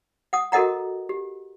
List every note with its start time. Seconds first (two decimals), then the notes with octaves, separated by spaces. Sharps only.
0.33 F#5 D#6
0.52 F#4 A4 A#4 D#5 F#5 A#5
1.09 G4